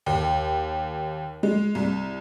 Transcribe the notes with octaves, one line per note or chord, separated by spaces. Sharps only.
D#2
G#3
C2